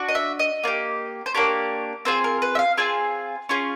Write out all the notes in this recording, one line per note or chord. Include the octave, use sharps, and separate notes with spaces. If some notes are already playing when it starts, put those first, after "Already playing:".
Already playing: D4 F#4
D#5
E5
D#5
A#3 D4 G4
C5
A#3 D4 G4 C#5
C4 F4 G#4 C5
A#4
B4
E5
F5
C4 F4 G#4 G#5
C#4 F4 G#4